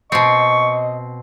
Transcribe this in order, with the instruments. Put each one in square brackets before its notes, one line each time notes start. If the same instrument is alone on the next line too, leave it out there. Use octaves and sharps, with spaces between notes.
[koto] B2 C4 [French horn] D#5 [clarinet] C#6